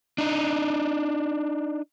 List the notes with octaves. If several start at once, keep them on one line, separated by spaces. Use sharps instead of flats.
D4 D#4